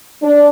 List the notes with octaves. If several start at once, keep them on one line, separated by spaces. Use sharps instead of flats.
D4